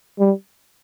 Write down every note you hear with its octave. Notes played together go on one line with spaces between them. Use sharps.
G3